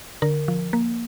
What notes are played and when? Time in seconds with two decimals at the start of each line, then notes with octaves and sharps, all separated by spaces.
0.22 D3 A#4
0.48 F3
0.73 A#3